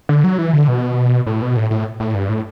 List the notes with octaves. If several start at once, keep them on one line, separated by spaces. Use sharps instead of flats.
D3
F#3
E3
D3
B2
A2
B2
A2
A2
A2
G2
A2